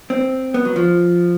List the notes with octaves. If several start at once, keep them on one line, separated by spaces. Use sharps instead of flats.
C4
B3
F#3
F3